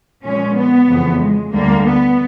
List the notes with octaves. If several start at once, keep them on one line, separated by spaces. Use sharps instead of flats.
A#2 F3 G#3 C#4
B3
F2 C#3 E3
G#3
D2 D3 G3 A#3
B3